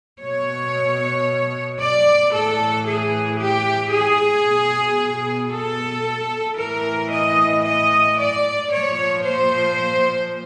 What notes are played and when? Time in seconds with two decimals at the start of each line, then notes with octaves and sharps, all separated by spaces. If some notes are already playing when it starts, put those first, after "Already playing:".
0.20 B2 C#5
1.79 D5
2.32 A2 E3 A4
2.86 G#4
3.39 G4
3.92 G#4
4.45 B2
5.51 A4
6.57 A2 E3 A#4
7.10 D#5
7.64 D#5
8.17 D5
8.70 A#2 F3 C#5
9.23 C5